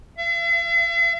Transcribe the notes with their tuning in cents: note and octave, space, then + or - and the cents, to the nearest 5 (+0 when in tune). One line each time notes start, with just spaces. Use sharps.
E5 +45